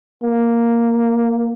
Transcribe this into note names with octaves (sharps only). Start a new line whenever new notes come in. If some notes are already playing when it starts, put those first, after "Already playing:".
A#3